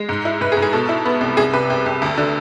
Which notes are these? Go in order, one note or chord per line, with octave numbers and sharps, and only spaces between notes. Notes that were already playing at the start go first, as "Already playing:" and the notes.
Already playing: G#3
G#2
E4
G#2 B4
G#4
G#2
G#4
B2 A4
E4
B3
C2
C2 G#4
C3 B4
C2
C2
D2
D3